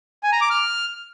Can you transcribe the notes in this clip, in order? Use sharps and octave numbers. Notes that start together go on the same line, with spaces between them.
G#5
A#5
D6
F6